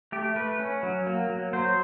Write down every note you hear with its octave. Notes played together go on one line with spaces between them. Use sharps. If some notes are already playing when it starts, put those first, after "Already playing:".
A3 G4
A3 B4
C#4
F#3
A#3
F#3
F#3 C5